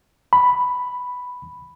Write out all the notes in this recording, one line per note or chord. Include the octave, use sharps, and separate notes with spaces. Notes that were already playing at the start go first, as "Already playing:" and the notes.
B5